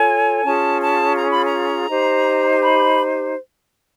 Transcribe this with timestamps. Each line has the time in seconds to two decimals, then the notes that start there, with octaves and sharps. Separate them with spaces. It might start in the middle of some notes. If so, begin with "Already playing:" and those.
Already playing: F4 A4 C#5 G#5
0.43 C#4 F4 G#4 A5
0.81 A5
1.17 A#5
1.30 B5
1.44 A#5
1.89 D#4 G4 C5
2.62 B5